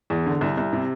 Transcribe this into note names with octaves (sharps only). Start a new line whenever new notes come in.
E2
D3
C2
C2
C3